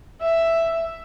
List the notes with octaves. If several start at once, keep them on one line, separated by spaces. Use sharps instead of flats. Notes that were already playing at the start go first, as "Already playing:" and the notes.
E5